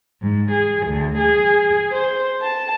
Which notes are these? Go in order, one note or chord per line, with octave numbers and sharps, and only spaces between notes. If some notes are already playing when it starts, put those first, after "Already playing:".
G#2
G#4
D2
G#4
C5
A5